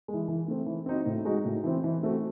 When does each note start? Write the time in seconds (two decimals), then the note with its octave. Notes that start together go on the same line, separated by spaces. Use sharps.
0.08 G#3
0.14 E3
0.28 E3
0.48 A3 C4
0.66 E3
0.86 C4 D#4 F#4
1.06 A2
1.25 G#3 D#4 F#4
1.45 A2
1.64 E3 C4
1.84 E3
2.03 A3 C4 F#4